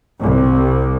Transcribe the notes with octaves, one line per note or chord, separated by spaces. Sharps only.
C2